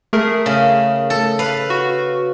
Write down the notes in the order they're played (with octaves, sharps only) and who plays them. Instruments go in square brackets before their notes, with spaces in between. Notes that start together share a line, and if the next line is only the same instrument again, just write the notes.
[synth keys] A3 G#4 A#4
[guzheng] C#3
A4
B4 F5
[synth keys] F#4